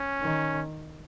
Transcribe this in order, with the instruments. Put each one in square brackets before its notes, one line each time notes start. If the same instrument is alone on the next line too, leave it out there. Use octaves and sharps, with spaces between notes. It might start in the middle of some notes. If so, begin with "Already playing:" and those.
Already playing: [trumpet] C#4
[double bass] D#3